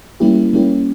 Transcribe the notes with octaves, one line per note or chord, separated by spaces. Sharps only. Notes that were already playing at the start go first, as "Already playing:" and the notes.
G3 A#3 C#4 E4 G4
G3 A#3 C#4 E4 G4